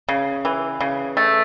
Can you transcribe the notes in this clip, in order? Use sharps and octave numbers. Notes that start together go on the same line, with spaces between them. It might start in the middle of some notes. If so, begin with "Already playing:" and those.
C#3
E3
C#3
A3